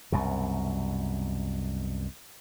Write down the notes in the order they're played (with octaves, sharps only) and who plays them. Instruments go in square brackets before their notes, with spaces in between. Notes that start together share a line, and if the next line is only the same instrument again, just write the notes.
[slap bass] C2 F#2 B2